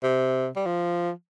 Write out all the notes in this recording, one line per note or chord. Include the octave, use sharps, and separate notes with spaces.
C3
G3
F3